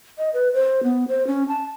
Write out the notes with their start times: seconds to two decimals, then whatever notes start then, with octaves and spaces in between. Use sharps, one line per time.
0.18 D#5
0.33 B4
0.53 C5
0.83 B3
1.08 C5
1.27 C#4
1.48 A5